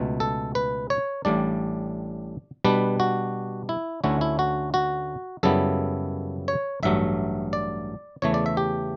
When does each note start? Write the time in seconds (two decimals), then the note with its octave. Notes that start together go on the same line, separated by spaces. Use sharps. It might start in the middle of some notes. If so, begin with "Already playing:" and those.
Already playing: C#2 B2 A3
0.20 A4
0.55 B4
0.90 C#5
1.25 A1 A2 G3 D4 D5
2.65 B2 G3 D4 B4
3.00 F#4
3.69 E4
4.04 D2 D3 A3 C#4 E4 F#4
4.21 E4
4.39 F#4
4.74 F#4
5.43 F#2 C#3 G3 B3 E4 A4
6.48 C#5
6.83 A1 G2 F#3 A3 E5
7.53 D5
8.22 E2 C#3 E3 A3 C#5
8.34 D5
8.46 E5
8.57 G4